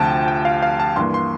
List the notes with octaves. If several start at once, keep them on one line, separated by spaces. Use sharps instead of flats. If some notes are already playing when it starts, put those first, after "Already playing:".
Already playing: D2 C3 F3 G5 A5
G5
F5
F5
A5
G2 E3 A#3 C6
C6